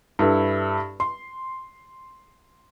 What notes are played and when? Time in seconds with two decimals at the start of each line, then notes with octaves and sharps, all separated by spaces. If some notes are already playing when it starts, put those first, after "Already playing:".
0.19 G2 E4 A4
1.00 C6